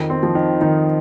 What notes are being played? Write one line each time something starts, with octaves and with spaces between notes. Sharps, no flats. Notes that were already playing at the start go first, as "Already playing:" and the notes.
Already playing: F2 D#3
C4
F3
D#3
D#3 D#4